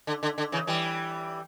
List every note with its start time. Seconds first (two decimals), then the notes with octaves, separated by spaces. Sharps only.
0.07 D3
0.23 D3
0.38 D3
0.52 C#3 E3
0.67 E3 G3